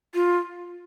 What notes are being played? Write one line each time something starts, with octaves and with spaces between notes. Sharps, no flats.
F4